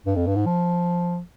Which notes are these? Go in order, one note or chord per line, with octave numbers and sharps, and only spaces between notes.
G2
F2
G2
G#2
F3